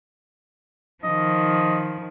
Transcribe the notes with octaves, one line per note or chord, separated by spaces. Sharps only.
D#3 F3 D#5